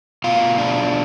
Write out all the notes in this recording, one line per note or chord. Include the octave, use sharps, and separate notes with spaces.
B2 F4 F5
D4